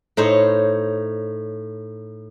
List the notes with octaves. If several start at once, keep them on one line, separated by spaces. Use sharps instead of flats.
A2 D#4 C5 C#5